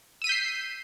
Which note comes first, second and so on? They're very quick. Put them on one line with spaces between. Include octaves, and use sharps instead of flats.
E6 D#7 B6 G6 C7